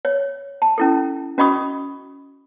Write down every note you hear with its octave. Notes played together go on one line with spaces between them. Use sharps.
C#5
A5
C#4 E4 A4
C#4 F#4 D#5 B5 C#6 D#6